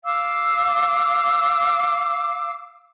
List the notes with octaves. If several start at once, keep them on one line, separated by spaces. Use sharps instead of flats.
F5 D6 E6